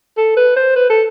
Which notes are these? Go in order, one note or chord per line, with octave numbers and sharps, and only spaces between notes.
A4
B4
C5
B4
A4